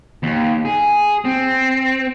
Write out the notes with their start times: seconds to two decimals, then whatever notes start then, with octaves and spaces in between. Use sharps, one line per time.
0.23 D#2
0.65 G#4
1.25 C4